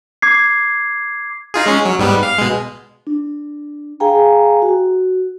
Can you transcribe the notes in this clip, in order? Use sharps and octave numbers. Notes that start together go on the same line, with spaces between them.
D6 G#6 C7
D#4 F4 G#4
G#3 C#4
F#3
G#2 G3 B3
F5
B2 G#3
D4
G#4 F5 G5 G#5 A#5
F#4